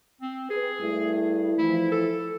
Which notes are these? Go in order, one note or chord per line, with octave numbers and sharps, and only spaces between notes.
C4
G#4 B4
G2 A3 E4
E3 F3 E4
A4